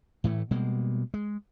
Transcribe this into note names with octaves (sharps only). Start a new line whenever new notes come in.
A2 E3 A3
B2 G3 G#3 A#3
G#3